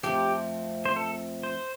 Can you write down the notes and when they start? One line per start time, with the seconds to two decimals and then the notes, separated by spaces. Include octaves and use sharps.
0.03 F2 F3 A3 C4 G4
0.85 C5
0.96 A4
1.43 C5